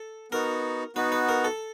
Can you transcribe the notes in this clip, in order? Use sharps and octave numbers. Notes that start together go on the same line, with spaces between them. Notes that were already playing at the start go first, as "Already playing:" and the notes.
Already playing: A4
B3 D#4 F#4 A#4
B3 D#4 F#4 B4
B4
A#4
A4